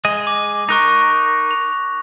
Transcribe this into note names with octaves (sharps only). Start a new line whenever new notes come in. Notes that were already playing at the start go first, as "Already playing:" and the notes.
G#3 D#5
D6
D#4 A#4 C#6 F#6 A#6
F7